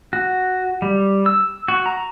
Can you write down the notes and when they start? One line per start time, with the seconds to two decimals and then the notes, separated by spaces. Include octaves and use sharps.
0.13 F#4
0.82 G3
1.26 E6
1.68 F#4
1.86 A#5